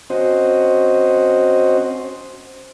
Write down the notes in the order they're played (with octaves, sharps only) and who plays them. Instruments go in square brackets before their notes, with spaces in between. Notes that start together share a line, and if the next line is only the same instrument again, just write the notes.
[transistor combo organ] C4 C#4 F#4 C5 D#5